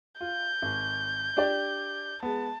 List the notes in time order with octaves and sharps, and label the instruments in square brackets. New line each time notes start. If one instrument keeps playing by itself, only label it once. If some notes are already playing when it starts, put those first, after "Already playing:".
[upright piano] F4 [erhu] G6
[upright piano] G#1
D4 G4 D5
[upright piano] G#3 B3 [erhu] A5